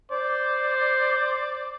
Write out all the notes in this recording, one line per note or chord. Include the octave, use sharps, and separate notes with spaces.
C5 D5